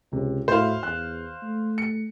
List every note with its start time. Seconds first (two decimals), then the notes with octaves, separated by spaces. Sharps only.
0.13 C#2 C3
0.48 A2 E4 F#4 C5 F5
0.83 E2 F#6
1.43 A3
1.78 C#7